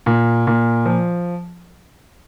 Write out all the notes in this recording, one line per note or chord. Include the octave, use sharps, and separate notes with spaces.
A#2
A#2
F3